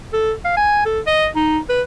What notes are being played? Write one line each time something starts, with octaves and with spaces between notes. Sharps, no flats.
A4
F5
G#5
A4
D#5
D#4
B4